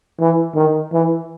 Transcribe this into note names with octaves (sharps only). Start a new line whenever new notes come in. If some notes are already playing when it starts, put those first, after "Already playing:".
E3
D#3
E3